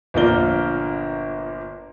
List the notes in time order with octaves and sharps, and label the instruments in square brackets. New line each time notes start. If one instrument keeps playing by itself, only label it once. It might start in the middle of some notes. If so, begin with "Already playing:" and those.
[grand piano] G1 A#2 F3 A#3 D4 G7